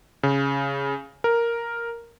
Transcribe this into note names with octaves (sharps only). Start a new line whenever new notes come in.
C#3
A#4